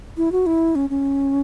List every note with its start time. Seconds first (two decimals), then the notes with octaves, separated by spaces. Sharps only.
0.17 E4
0.32 F#4
0.46 E4
0.75 C#4
0.90 C#4